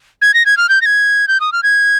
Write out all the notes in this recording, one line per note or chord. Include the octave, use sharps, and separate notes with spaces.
G#6
A#6
G#6
F6
G6
A#6
G#6
G6
D#6
F6
G#6